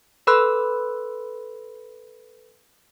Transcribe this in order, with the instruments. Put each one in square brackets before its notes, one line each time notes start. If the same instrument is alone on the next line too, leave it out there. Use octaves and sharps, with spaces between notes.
[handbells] A4 B4 B5 C6 E6 F#6